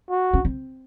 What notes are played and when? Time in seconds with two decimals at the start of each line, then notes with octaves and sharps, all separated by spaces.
0.10 F#4
0.34 C#4
0.45 C4